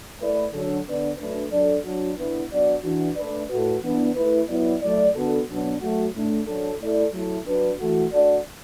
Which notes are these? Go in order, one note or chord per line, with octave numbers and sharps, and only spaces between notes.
A3 E4 B4 D5
D3 F#3 D4 A4
D3 B3 D4 B4 D5
F#3 A3 D4 B4
F#3 D4 A4 D5
F#3 D4 F#4
D3 B3 E4 B4
F#3 B3 D4 F#4 D5
E3 D4 F#4
A3 D4 B4 D5
A2 A3 F#4 B4
E3 B3 D4
A3 E4 B4
F#3 B3 E4 D5
F#3 A3 E4 D5
D3 B3 F#4 A4
B2 F#3 B3 D4
F#3 A3 F#4
A2 A3 D4
F#3 D4 A4
A3 E4 A4 D5
F#3 A3 E4 A4
F#3 D4 B4
E3 A3 F#4
A3 D4 F#4 A4 D5